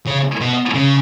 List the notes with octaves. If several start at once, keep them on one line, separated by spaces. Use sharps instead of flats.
C#3
B2
C#3